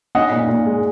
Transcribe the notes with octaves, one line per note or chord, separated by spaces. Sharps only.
C#4 D#5 F#5
A#2
A#2
G#3